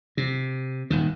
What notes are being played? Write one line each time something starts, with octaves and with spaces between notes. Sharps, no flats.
C3
D#1 G#2 D#3